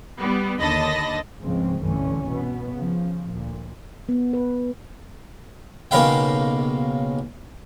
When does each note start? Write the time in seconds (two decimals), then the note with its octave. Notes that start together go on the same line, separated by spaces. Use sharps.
0.18 G3 B3
0.59 D#2 D3 D#5 A5 B5 A#6
1.43 C#2 G#2 C#3 F3 G#3 C4
1.82 G1 C2 D3 E3 A3 C#4
2.28 B2 B3
2.75 C#3 F3
3.31 D2 A#2
4.09 B3
4.33 B4
5.91 B1 C#3 A#3 B4 F5 G5